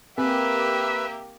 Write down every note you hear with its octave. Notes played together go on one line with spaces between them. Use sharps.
A#3 C4 G4 B4 E5